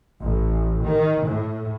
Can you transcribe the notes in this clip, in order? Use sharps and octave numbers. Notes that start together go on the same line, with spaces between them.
A1
D#3
A2